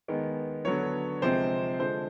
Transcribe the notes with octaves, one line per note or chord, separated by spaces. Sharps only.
D#3 G#3 B3
D3 F#3 B3 C#5
C3 F3 G#3 C4 C5
D3 F3 G#3 C5